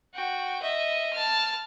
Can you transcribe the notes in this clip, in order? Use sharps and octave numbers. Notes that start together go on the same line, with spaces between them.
F#4 G5
D#5 E5
A5 F6